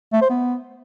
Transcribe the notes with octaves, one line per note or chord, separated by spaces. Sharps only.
A3
C5
B3